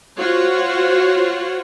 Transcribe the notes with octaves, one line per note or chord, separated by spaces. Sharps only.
F4 F#4 C5 C#5 F#5